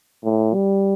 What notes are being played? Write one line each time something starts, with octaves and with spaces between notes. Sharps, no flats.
A2
G3